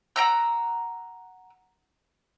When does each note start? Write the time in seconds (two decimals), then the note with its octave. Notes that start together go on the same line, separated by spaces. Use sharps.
0.16 F#5 G5 A#5 E6